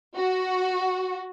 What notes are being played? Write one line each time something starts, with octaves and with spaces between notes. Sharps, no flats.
F#4